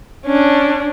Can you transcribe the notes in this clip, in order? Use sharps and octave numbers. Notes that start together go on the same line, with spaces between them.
C#4 D4